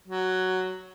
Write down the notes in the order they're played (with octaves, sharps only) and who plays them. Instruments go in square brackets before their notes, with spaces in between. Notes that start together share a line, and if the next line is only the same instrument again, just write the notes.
[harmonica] F#3